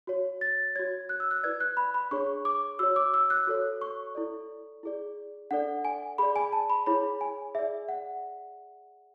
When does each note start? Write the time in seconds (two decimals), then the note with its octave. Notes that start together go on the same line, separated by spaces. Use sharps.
0.07 F#4 C#5
0.41 A6
0.75 F#4 C#5 G#6
1.09 F#6
1.20 E6
1.31 F#6
1.43 E4 B4 D5 G#6
1.60 F#6
1.77 B5
1.94 B5
2.11 D4 G#4 C#5 C#6
2.45 D6
2.79 F#4 C#5 E6
2.96 D6
3.14 E6
3.30 F#6
3.47 F#4 A4 C#5
3.81 C#6
4.15 E4 A4 D5
4.83 E4 G#4 D5
5.51 D4 A4 D5 F#5
5.85 G#5
6.18 G#4 D5 B5
6.36 G#5
6.52 A5
6.70 B5
6.86 E4 G#4 C#5 B5
7.21 G#5
7.55 G#4 D5 E5
7.89 F#5